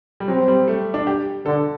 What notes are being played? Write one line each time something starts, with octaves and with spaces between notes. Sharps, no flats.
G3
F#3 C4
G3
A3
D4
G4
D3 A4